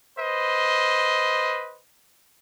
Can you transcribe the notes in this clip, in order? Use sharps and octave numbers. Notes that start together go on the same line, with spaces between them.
B4 C5 D#5